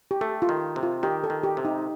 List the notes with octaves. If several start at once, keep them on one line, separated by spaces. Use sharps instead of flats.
G4
A3 A4
F4
D#3
C3
F4
D#3 G4
A4
D#3
G4
C3
D#4